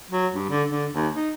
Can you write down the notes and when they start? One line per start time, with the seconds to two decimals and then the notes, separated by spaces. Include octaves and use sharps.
0.10 F#3
0.33 G2
0.49 D3
0.70 D3
0.94 D#2
1.13 D#4